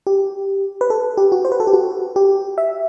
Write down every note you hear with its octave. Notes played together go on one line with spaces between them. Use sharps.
G4
B4
A4
G4
F#4
C5
B4
A4
G4
F#4
G4
E5